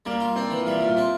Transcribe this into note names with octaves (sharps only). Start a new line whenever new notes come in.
G3 A#3
F4
C4 D4
E3
F4
G3 E4
A#2 E4
F4
C4